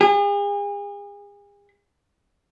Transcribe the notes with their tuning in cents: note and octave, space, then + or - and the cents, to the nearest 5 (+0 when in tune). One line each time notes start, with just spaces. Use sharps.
G#4 -40